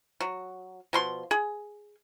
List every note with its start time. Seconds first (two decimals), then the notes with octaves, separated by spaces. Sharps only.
0.20 F#3
0.93 B2 F3 C6
1.31 G#4